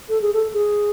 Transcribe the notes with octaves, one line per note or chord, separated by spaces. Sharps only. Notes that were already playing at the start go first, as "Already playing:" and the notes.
A4
G#4
A4
G#4